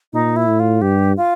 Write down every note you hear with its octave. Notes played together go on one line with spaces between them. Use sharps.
A#2 D#4
E4
A2
F4
G2 G4
F4